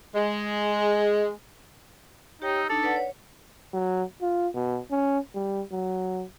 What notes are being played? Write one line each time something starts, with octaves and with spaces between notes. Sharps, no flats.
G#3
D#4 G4 C#5 G5
E6
D4 D#4 A4
B4 D5 F#5
C#5
F#3
F4
B2
C#4
G3
F#3